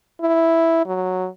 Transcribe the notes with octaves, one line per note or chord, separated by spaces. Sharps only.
E4
F#3